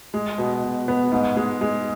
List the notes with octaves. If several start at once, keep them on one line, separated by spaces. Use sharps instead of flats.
G#3
B2
B2
B3
G#2
G#3
G#3